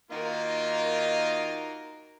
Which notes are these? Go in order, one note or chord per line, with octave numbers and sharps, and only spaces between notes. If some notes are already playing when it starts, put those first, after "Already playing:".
D#3 A#3 D#4 F4 F#4 A#4